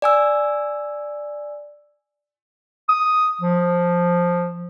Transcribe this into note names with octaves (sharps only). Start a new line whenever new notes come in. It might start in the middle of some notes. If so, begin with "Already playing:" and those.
D5 G#5 E6
D#6
F3